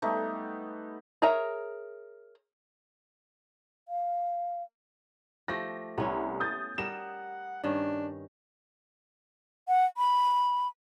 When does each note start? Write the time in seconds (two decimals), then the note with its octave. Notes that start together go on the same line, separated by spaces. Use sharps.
0.02 G3 A3 B3 D#4
1.22 G#4 A#4 C#5 E5 A#5
3.88 F5
5.48 F3 A3 G4 A#6
5.98 C2 B3 C#4 E4
6.40 D#6 G6 A6
6.78 G3 A#4 D#5 F#5 E7
7.64 G2 D#3 C#4 D4
9.68 F#5
9.97 B5